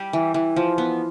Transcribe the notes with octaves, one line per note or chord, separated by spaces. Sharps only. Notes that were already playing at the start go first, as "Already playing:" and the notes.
Already playing: G3 G4
E3
E3
F3
B3